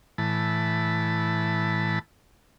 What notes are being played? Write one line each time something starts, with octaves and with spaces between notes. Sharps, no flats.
A2 E3 A5 B5